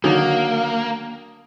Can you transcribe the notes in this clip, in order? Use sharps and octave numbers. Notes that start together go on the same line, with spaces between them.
D3 D#3 F#3 A#3